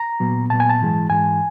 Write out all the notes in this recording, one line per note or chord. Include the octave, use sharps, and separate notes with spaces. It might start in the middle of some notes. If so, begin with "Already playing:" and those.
Already playing: A#5
A#2 F#3 B3
A#2 F#3 B3 A5
G#5
A5
G#2 E3 G#3
G#2 E3 G#3 G#5